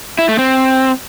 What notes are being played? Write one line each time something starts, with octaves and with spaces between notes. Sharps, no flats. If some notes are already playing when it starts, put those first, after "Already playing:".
E4
A3
C4